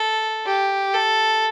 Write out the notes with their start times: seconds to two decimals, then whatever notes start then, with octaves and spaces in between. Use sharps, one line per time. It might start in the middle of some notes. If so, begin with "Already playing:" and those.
Already playing: A4
0.46 G4
0.94 A4